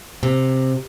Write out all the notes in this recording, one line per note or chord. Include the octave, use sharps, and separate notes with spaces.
C3